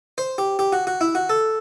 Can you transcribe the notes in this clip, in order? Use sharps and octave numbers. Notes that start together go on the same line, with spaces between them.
C5
G4
G4
F#4
F#4
E4
F#4
A4